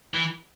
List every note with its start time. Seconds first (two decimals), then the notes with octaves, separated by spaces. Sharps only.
0.15 E3